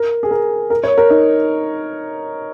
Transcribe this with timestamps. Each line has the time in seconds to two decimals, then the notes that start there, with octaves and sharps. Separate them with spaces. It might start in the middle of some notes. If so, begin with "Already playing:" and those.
Already playing: A#4
0.23 G#4
0.31 A#4
0.70 A#4
0.84 C#5
0.98 A#4
1.10 D#4